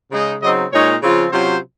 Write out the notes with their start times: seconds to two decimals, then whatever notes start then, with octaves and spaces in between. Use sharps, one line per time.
0.11 C#3 G#3 D#4
0.42 C#3 F#3 C4 D#4 D#5
0.72 A#2 G#3 D#4 C#5
1.01 C#3 F3 C4 F4
1.32 C3 F#3 C#4 F4 C5